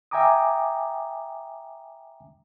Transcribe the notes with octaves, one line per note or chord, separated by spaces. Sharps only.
E5 G5 G#5 A#5 D6 D#6